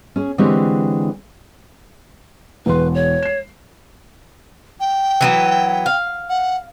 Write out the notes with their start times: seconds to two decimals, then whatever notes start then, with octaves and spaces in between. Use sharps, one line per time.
0.16 C#4 G#4
0.38 D3 E3 G#3 C4 G4 C#5
2.66 E1 E2 B4 C6
2.95 C#5
3.23 C7 E7
4.80 G5
5.21 E3 F#3 B3
5.86 F5
6.29 F#5